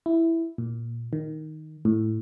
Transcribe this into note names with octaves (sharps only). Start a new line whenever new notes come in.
E4
A#2
D#3
A2